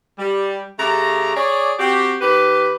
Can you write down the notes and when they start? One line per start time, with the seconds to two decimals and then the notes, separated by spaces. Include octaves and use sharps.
0.19 G3
0.79 C#3 A3 G4 A#5
1.36 G#4 C#5 D5
1.80 C4 F#4 G4
2.21 D#3 G4 B4